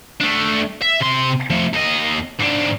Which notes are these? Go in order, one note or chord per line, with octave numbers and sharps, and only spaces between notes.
A3 D4
E5
C3 C6
F3 A3
D#2 D#5
G#2 D4